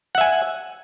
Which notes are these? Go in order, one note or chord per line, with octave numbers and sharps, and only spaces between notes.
E5 F#5 G#5